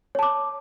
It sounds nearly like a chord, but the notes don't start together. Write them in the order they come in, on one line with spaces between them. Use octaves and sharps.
C#5 A5 D6